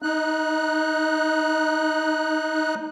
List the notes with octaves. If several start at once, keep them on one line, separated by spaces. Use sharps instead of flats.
D#4 F#6